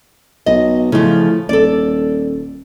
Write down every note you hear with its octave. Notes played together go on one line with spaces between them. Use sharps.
B1 D#5
A2 C#3 F3
D#1 A4 D5